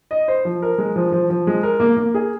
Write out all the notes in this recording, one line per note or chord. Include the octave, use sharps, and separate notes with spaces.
D#5
C5
F3
A#4
G#3
F3
F3
F3
G#3
A#4
A#3
A#3
G#4